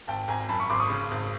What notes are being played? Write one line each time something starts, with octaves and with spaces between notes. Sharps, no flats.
G#1 G5 A5
G#1 G#5 A#5
F#2 A5 B5
B5 C#6
G#1 C6 D6
C#6 D#6
C#3
G#1